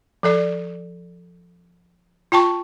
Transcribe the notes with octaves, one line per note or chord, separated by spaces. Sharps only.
F3 A4 D5
F4 G5 A5 C#6